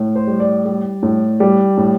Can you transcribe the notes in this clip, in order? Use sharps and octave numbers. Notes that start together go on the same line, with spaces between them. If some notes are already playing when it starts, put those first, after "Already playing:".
Already playing: A2
C5
G3
D5
G3
A2
G3
A2